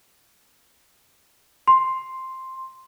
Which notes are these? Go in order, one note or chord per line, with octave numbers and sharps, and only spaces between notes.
C6